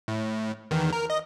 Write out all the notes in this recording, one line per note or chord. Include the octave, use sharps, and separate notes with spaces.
A2
E2 D#3
A#4
D#5